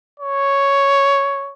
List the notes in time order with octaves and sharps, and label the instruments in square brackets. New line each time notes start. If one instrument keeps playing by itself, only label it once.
[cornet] C#5